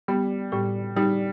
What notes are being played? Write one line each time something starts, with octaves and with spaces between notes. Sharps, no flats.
G3 B3
A2 G3
G3 D#4